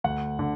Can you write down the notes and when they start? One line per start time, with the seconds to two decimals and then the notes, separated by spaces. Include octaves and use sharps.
0.04 D2 F#5
0.39 D3